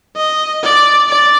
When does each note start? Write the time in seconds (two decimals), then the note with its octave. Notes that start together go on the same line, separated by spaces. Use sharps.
0.16 D#5
0.63 D5
1.09 D5